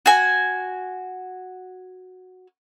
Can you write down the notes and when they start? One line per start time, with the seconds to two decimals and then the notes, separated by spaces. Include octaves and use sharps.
0.06 F#4 G#5